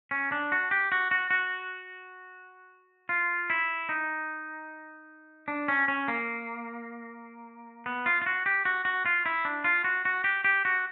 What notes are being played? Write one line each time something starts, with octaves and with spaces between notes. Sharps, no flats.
C#4
D4
F#4
G4
F#4
F#4
F#4
F4
E4
D#4
D4
C#4
C#4
A#3
B3
F4
F4
F#4
G4
F#4
F#4
F4
E4
D4
F4
F#4
F#4
G4
G4
F#4